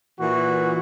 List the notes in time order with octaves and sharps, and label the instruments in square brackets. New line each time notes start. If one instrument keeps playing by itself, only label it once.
[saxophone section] A#2 E3 [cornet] F#4